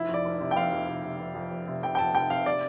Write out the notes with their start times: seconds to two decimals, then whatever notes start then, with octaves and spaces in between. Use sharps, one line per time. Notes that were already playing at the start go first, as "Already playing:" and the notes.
Already playing: F1 E4
0.09 F2 D5
0.25 F1
0.40 C3
0.51 G5
0.56 F1 F5
0.72 F2
0.88 F1
1.04 C3
1.20 F1
1.35 F2
1.51 F1
1.67 C3
1.83 F1 G5
1.95 G5
1.98 F2 A5
2.15 F1 G5
2.30 C3 F5
2.46 D5